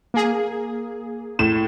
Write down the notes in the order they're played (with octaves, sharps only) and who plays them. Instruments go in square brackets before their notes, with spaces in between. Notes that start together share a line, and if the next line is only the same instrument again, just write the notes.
[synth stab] A#3 G#4
[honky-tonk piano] A2 E7